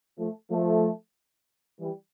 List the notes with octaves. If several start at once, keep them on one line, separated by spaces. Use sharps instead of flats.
F3 A3
F3 A3
E3 G3